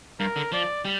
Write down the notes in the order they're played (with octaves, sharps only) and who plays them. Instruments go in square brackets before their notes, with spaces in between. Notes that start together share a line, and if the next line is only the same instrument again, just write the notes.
[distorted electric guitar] G2 [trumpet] A#4
[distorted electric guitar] D3
[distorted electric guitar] F3 [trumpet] D5
[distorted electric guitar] G3